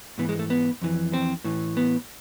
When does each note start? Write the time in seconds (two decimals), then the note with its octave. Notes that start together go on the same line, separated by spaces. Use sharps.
0.18 G#2 E3 B3
0.29 G#3
0.39 A3
0.50 B3
0.82 F2 E3
1.13 C4
1.44 A2 E3
1.77 B3